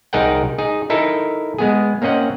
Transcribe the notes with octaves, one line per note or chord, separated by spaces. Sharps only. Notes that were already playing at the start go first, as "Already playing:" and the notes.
C2 D#4 G#4 A#4 F#5 G5
D#4 G#4
D#4 E4 A4 A#4
G#3 B3 G#4
A#3 C4 C#4 D#5 F#5